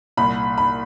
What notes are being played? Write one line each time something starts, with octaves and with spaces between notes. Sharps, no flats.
C2 A#2 B5
B5